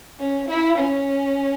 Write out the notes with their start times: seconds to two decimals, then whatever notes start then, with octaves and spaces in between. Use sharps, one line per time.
0.20 C#4
0.49 E4
0.78 C#4